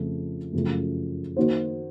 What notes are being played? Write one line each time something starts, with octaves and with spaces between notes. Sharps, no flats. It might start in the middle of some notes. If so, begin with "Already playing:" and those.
Already playing: F2 C#3 F3 A3
F#2 C#3 F3 A3
D#3 A#3 D#4 F#4 C5